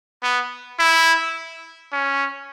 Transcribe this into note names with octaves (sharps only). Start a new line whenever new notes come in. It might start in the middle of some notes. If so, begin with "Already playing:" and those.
B3
E4
C#4